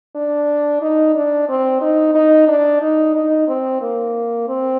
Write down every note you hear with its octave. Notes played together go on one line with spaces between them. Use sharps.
D4
D#4
D4
C4
D#4
D#4
D4
D#4
D#4
C4
A#3
C4